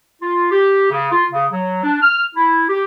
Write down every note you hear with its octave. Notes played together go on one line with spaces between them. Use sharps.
F4
G4
C#3
F4
C#3
F#3
D4
F6
E4
G4